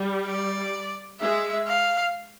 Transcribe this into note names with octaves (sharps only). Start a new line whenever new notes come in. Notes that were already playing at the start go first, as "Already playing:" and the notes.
Already playing: G3
D5
G#3 E5
F5